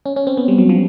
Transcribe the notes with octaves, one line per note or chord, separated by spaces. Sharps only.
C#4
C#4
C4
B3
G3
F#3
F3